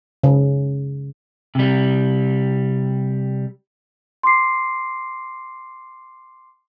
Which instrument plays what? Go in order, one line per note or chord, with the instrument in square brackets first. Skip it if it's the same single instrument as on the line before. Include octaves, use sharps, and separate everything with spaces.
[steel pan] C#3
[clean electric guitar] C3 G3
[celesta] C6 D6 C7